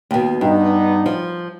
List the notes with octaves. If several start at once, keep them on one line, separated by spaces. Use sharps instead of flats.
D#2 B2
G2 B3 D4 D#4
F3